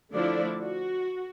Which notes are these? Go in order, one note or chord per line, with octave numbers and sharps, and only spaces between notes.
D3 F3 A3 D4 E4 D5
F#4